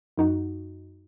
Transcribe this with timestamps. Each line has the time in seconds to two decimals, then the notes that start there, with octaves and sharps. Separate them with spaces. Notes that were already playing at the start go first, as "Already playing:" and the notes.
0.18 F#2 D#4 F#4